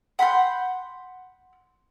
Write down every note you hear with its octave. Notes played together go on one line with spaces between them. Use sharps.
F#5 B5 C6 G6